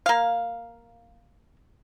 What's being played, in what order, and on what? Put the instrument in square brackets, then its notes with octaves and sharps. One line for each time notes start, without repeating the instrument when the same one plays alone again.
[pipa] A#3 F5